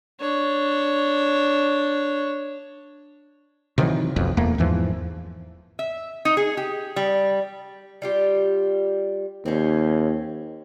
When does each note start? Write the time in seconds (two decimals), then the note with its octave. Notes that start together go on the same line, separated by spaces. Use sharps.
0.20 D4 C#5
3.78 C3 D#3 E3 F#3
4.16 F1 B1 F2
4.37 E1 E2 A3 A#3
4.58 E2 G#2 E3 F3
5.79 E5
6.25 D#4
6.37 G#4
6.57 G4
6.96 G3
8.02 G3 F4 G4
9.46 D#2 C4 C#4